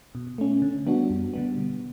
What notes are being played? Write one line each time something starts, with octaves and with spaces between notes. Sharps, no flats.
B2
A3 C#4
D3
G3 B3 D4 F#4
F#2
D3 G3 B3
B2